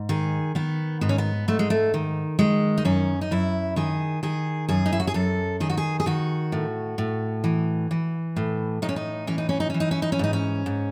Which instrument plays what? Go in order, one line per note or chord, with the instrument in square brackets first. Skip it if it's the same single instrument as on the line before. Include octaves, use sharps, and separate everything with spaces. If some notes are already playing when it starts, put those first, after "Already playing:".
Already playing: [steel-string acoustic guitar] G#2
D#3 G#4
D#3 B3
G#2 B3
C#4
B3
G#2 A3
G#3
A3
D#3
D#3 G#3
D#4
F#2 C#4
D#4
F#2 E4
D#3 G#4
D#3 G#4
F#2 G#4
D#4
E4
F#4
G#4
F#2 A4
D#3 G#4
F#4
G#4
G#4
D#3 F#4
A2
A2
E3
E3
A2
A2 D#4
C#4
D#4
E3 C#4
D#4
C#4
D#4
E3 C#4
D#4
C#4
D#4
C#4
G#2 D#4
C#4
G#2